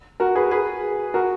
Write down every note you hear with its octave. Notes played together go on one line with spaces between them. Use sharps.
F#4 A#4
G#4 B4
G#4 B4
F#4 A#4